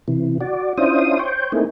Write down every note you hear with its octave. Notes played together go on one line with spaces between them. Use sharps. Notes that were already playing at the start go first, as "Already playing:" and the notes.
C3 E3
F#4 D5
C#4 D4 E4 F4 C5 D#6
C5 C#5 G5
A3 A#3 C4 D#4 E4 G#4